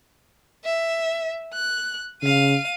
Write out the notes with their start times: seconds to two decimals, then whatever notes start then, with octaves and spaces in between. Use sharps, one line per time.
0.65 E5
1.54 F#6
2.23 C#3 F5 D#7